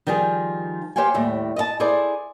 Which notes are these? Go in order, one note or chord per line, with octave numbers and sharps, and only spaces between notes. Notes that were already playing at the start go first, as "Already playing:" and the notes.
D#3 F3 G3 F4 G#4
G4 C5 C#5 F5 G5 G#5
D#2 A2 G3 E5
D#5 E5 A5
E4 G#4 A4 C5 D5